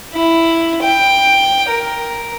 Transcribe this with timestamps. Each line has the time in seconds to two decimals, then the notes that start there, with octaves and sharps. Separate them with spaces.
0.13 E4
0.82 G5
1.69 A#4